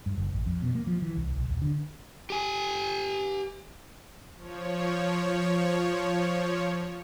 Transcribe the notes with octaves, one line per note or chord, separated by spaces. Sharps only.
G2
F#1
A1
F2
B2
A#3
F3
E3
C2
B1
D#1
D3
G4 G#5
F3 C#5